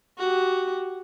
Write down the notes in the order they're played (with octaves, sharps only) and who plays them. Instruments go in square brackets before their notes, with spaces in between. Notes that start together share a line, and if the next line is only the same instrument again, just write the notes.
[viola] F#4 G4